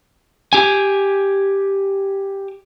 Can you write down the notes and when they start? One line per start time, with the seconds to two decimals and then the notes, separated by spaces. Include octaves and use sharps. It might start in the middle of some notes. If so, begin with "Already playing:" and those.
0.53 G4 G#5